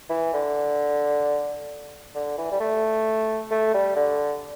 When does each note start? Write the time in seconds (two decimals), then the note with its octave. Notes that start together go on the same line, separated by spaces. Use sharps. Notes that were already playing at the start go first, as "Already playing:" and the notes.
0.10 E3
0.34 D3
2.15 D3
2.38 E3
2.51 G3
2.60 A3
3.51 A3
3.74 G3
3.96 D3